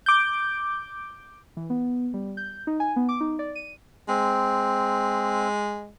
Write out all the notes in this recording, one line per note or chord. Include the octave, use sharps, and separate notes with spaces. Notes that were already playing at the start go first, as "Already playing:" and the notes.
D6 G6
E3
B3
G3
G6
D#4
G#5
B3
D6
D#4
D5
D#7
G#3 C4